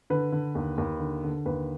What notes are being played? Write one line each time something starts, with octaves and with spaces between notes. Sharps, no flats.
D3 B4
D3
D#2
D#2
D3
D3
D#2 B4